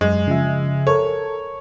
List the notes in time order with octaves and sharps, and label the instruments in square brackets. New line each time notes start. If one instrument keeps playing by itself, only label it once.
[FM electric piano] F#2 [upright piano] G#3
[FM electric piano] C#3 F3 E5
[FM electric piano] A4 A#4 [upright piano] C#5